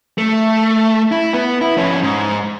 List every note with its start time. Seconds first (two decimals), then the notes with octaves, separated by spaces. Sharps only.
0.18 A3
1.12 E4
1.33 B3
1.61 E4
1.78 F3 C#4
2.03 G#2